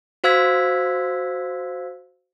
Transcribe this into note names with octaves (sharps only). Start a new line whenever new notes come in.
F#4 C5 F5 E6 G#6 B6